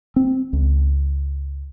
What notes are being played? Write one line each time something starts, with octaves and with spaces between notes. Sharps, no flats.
C4
C#2